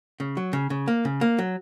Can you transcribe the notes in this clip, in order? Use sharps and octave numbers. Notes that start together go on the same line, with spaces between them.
C#3
F#3
C#3
C#3
A#3
C#3
A#3
F#3